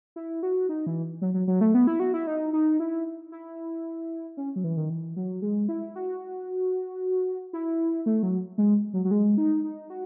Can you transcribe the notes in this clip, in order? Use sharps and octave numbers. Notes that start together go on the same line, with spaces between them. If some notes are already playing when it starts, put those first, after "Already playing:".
E4
F#4
D#4
E3
F#3
F#3
F#3
A3
B3
E4
F#4
E4
D#4
D#4
E4
E4
C#4
F#3
E3
D#3
E3
F#3
G#3
E4
F#4
E4
A3
F#3
G#3
F#3
F#3
G#3
D#4
D#4
F#4